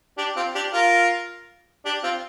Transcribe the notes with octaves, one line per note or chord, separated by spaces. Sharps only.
D4 G4
C4 F4
D4 G4
F4 A#4
D4 G4
C4 F4